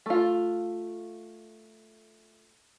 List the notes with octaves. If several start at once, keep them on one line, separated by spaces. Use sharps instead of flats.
A3 F4